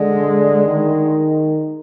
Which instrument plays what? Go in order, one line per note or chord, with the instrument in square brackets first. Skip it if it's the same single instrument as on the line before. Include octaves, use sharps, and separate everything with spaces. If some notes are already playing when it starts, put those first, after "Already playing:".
Already playing: [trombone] D3 [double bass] G#3
[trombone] D#3